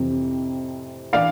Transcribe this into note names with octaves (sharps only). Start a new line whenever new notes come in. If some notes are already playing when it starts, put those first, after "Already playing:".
Already playing: F2 C3 E3
E3 D5 F5